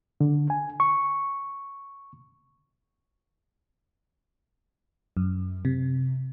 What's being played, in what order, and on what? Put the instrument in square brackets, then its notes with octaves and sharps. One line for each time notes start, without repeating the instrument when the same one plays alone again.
[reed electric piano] D3
G#5
C#6
[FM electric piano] F#2
C3